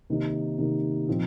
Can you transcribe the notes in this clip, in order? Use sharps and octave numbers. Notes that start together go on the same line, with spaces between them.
C3 D#3 A#3 D#4
C3 D#3 A#3 D#4
A#2 F3 C4 D#4